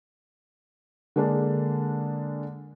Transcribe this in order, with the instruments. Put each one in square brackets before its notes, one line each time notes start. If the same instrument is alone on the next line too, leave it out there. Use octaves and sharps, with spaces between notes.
[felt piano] D3 G#3 A#3 D4